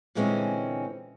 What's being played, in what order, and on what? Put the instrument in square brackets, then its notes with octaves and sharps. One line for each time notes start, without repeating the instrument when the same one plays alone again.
[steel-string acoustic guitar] A#2 D3 E3 G#3 C4 C#4